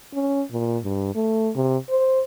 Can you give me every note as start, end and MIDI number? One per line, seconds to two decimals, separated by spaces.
0.14 0.42 61
0.51 0.78 46
0.84 1.11 43
1.15 1.51 57
1.56 1.77 48
1.89 2.22 72